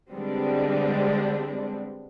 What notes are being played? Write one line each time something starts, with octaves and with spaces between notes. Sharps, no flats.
D3 G3 G#3 B3 C4 D4